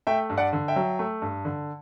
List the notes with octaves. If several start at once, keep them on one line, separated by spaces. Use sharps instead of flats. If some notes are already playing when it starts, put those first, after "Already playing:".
A3 E5 G5
G2
D5 F#5
D3
E5 G5
F#3
A3
G2
D3